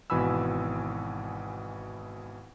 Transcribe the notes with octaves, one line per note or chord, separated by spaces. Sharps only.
G#1 B2 E3 G#5 B5 E6